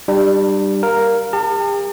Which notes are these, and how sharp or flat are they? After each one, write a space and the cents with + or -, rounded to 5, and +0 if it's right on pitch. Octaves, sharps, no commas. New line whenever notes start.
G3 +0 D4 +35
A#4 +0 F5 +0
G4 +40 A5 +45